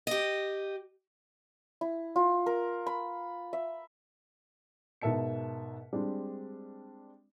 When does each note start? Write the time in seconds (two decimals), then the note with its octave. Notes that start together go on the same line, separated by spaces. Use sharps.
0.07 G4 D#5
1.81 E4
2.16 F4
2.46 A#4
2.87 B5
3.53 E5
5.01 G#2 B2 A#4 E5 A5 C#7
5.93 G3 G#3 C4 D4